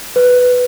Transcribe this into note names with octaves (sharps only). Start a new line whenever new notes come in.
B4